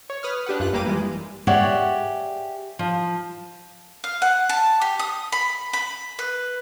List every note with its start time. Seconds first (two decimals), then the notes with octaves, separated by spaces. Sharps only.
0.10 C#5
0.23 B4 D#6 F6
0.46 D4 G4 B4 F#5
0.60 F#2 F4 F#6
0.73 G#1 G2 A#3 G4 D6 D#7
0.85 E3 G3 G#3
1.47 G4 G#4 C#5 D5 E5 F#5
2.79 F3
4.04 F5
4.22 F#5
4.49 A5
4.81 G4
4.99 D#6
5.32 B5
5.73 B5
6.19 B4